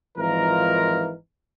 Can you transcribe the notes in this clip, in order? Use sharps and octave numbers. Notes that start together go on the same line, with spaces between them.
G#1 E3 F3 D#4 F4 A#4